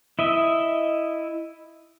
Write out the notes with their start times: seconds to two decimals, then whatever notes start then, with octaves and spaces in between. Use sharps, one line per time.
0.19 E4 D#5 E5